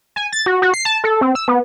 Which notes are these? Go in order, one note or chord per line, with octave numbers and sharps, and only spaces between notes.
G#5
A6
F#4
F#4
C7
A5
A4
C4
E6
B3